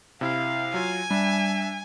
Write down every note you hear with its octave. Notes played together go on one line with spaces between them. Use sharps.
C3 E4 F5
F#3 F4 G#5
G3 D4 E5